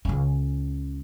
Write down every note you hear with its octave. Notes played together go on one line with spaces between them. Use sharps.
C#2 C#4